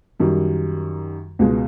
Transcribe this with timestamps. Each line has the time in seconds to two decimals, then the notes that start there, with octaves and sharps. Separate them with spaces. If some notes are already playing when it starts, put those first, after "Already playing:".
0.20 F#2 D#3 G3
1.39 C#2 B2 G#3